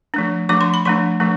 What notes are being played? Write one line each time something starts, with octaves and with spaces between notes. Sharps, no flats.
F3 A3 D4
F3 A3 D4 D6
C6
B5
F3 A3 D4 C6
F3 A3 D4